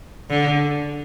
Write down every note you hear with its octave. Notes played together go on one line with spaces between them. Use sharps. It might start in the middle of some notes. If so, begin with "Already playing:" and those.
D3